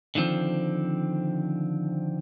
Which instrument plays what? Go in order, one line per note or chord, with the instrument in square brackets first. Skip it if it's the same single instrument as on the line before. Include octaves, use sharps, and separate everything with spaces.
[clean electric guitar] D3 D#3 F3 C4